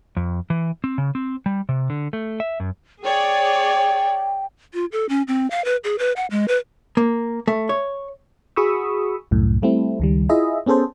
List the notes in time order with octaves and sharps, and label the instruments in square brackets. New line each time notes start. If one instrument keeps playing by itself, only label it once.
[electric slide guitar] F2
E3
C4
C#3
C4
G3
C3
D3
A3
E5
F#2
[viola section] G#4 C#5 D5 [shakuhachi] G5
[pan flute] F4
A4
C#4
C4
F5
B4
G#4
B4
F#5
G#3
B4
[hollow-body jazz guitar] A#3
A3
C#5
[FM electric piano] F#4 G#4 B5 C#6 D#6 E6
C2 F#2 A2
G3 A3 C4 E4
C#2 D#3 G3
E4 F4 G#4 D#5 E5
B3 C#4 G#4 A4 C5